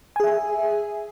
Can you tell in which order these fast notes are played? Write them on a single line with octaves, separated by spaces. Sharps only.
G#5 G#4 E5